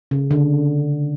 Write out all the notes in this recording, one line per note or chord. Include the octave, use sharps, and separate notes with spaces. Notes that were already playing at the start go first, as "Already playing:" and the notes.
C#3
D3